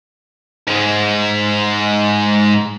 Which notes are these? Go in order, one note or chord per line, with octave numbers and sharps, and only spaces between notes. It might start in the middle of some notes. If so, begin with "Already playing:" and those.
G#2 G#3